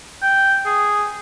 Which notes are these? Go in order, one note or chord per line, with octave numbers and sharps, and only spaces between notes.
G5
G#4